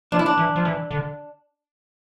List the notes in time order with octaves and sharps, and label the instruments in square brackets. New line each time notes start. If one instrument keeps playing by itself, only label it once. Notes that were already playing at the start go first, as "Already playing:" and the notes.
[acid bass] F3 [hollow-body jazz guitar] D4
[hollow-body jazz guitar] E4
D4
[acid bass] E3
F3
E3
D3